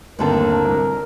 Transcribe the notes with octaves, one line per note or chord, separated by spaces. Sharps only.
G1 D#2 A2 D3 C4 A#4 A5
C2